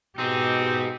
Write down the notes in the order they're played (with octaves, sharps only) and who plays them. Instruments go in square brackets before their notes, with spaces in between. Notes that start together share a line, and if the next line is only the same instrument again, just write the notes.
[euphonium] B2 [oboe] C4 [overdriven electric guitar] D#4 G#4 [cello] G4